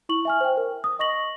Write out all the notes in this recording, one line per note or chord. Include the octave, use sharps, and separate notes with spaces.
E4 C#6 F#7
E5 G#5 F6
C5 G5
A#4
D#6
D#5 C#6 A#6 F#7